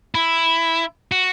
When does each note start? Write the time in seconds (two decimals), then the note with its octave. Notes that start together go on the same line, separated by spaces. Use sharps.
0.15 E4
1.12 F#4